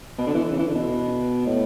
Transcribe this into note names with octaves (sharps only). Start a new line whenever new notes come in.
B2
D3
E3
C#3
E3
D3
B2
A2